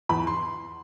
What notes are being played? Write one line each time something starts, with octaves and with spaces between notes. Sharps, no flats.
E2 B5
C6